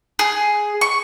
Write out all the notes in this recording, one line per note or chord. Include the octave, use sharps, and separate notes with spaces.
G#4
C#6